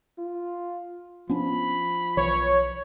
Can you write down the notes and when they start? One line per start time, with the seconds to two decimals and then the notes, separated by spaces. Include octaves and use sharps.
0.18 F4
1.29 F3 B3 C#4 D4 B5
2.17 B1 E3 C#5